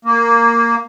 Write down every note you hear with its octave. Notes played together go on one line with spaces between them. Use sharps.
A#3